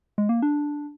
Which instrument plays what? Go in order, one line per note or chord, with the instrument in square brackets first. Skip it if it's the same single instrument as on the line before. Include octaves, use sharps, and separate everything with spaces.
[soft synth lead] G#3
A#3
D4